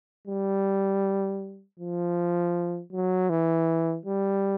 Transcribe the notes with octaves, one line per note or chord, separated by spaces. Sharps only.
G3
F3
F#3
E3
G3